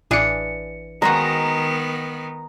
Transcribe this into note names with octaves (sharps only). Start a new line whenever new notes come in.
A1 E3 D4 G#4 C#7
D#3 G#3 B3 D#4 F#4 A#5